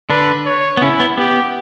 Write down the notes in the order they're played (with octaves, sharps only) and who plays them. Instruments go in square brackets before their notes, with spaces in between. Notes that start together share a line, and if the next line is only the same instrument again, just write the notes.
[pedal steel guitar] D3 D4 [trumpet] B4
[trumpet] C#5
[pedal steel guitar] B3
[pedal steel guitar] C#3 C#4 [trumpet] E4
[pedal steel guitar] B3
[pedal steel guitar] B3 [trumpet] G4